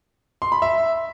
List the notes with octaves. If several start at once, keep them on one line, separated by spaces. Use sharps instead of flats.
C6
B5
E5